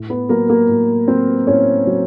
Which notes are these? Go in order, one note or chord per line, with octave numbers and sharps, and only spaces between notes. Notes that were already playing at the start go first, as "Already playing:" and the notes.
Already playing: A2
B3 B4
F#3 A#3 A#4
A#3 A#4
A2
F#3 C4 C5
A2 C#4 C#5
F#3